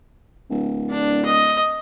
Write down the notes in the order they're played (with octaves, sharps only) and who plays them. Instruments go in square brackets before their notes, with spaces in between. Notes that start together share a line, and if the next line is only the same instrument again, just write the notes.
[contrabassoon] D1
[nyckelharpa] D4
D#5